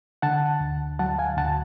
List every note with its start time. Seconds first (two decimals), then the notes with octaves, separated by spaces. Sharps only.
0.22 D3 F#5 A5
0.61 D2
0.99 F#3 F#5 A5
1.19 F5 G#5
1.37 D2 F#5 A5